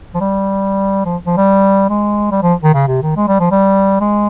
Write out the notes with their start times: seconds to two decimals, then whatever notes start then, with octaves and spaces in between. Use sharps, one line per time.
0.15 F3
0.21 G3
1.05 F3
1.26 F3
1.37 G3
1.89 G#3
2.32 G3
2.42 F3
2.64 D#3
2.74 C#3
2.88 C3
3.02 D#3
3.17 G#3
3.28 G3
3.40 F3
3.51 G3
4.01 G#3